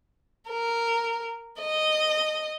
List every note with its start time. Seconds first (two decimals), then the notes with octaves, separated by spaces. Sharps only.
0.50 A#4
1.60 D#5